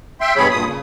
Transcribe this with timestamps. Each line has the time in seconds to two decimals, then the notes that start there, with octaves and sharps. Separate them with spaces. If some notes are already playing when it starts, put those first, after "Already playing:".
0.21 E5 G5 C6
0.37 G2 B2 F#3 G#4 C#5 B5
0.51 G2 A#2 D#6
0.66 C#3